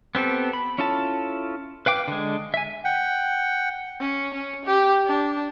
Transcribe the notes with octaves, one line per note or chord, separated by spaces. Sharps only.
B3 C4 G4 A4
B5
C#4 E4 F4 A4 A5
B4 F5 G5 D6
D3 G#3
E5 G#5
F#5 G5
C#4
C#4
G4
D4